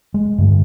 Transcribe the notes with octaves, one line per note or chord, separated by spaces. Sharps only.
G#3
G2 D3